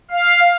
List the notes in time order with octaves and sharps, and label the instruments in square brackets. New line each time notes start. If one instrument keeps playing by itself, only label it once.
[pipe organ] F5